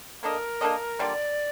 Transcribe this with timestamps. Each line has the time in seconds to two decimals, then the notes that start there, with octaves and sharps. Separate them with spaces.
0.23 A#3 D4 A4 A#4 D#5
0.61 A#3 D4 A4 D#5
0.99 D3 G3 A#3 F4 D5